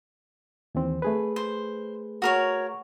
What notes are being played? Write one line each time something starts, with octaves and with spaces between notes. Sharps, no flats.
D#2 E3 C4
A3 G#4 B4
C5
F#4 A#4 C#5